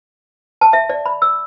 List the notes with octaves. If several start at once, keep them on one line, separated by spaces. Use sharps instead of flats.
A5
E5
D5
B5
E6